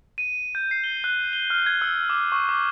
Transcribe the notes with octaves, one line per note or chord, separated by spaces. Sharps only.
D#7
G6
C7
G7
F#6
G7
F6
G#6
E6
D6
C#6
D6